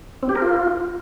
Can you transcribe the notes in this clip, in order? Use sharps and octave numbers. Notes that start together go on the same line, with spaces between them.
C4
G4
A#4
F4